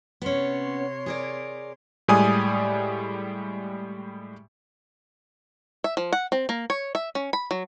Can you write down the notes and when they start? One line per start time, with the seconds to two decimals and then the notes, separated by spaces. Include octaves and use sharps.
0.22 C3 B3 C#4 C#5 C6
1.06 G#4 A#4 D5
2.08 A2 G3 G#3 D5 G#5 D#6
5.84 E5
5.97 F3
6.12 F#5
6.32 C4
6.49 A#3
6.70 C#5
6.95 E5
7.15 C#4
7.33 B5
7.51 F#3